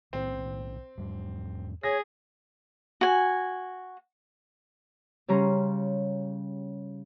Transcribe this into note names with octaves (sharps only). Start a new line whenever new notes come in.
B1 A2 D#3 C4
E2 G#2 G3
G#4 C#5 A#6
F#4 G#5
C#3 G3 C#4 A#5 C6